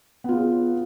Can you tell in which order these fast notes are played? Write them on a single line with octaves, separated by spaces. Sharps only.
B3 F4 G#4 C#5